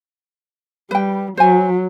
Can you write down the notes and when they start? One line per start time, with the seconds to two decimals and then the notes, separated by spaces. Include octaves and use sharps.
0.91 G3 B4 G5
1.37 F#3 C5 G#5